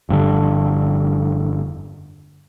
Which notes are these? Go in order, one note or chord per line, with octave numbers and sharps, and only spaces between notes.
F1 G2 B2 D3